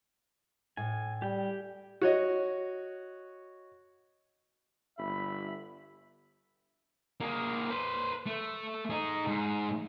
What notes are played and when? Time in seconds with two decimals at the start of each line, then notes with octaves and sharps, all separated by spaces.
0.77 A2 G#5
1.22 G3 G4 G5
2.02 F#4 C#5 D#5
4.98 G1 E5 B5
7.20 A#3 G#4
7.70 B4 C5
8.26 A3
8.90 D#4 G#4
9.27 G#2